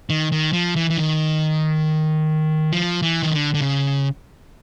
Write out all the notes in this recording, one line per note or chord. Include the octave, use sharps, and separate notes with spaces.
D#3
D#3
F3
E3
E3
D#3
F3
E3
D#3
D3
D3
C#3